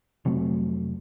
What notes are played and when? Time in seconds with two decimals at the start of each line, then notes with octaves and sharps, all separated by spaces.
0.25 F1 C3 F#3 A3